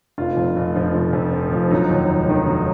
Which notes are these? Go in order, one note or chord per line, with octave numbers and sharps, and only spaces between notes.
F1 F4
F2
F1
F3
F1
F2
F1
F3
F#3 D#4
D#2
F1
D#3
F#3